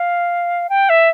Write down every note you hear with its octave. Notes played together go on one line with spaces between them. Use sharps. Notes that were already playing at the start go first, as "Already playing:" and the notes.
Already playing: F5
G5
E5